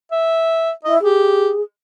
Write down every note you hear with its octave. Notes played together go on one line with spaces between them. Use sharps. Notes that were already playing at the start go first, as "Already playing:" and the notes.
E5
E4 D#5
G4 G#4